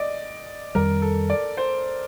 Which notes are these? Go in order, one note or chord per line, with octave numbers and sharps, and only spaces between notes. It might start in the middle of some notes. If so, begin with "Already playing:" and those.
Already playing: D5 D#5
F2 D#3 G3 A#4
A4
D5
C5